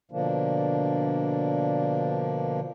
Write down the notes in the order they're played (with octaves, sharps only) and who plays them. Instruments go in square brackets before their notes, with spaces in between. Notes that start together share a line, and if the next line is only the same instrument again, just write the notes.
[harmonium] B2 D3 F3 A#3 D4